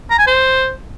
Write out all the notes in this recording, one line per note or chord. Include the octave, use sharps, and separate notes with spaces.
A#5
G#5
C5